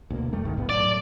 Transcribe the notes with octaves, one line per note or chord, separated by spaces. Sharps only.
D2 B2 A#3
E2 G3 A3
C2 G#2 D#3
A1 G2 B3
A2 F#3 D5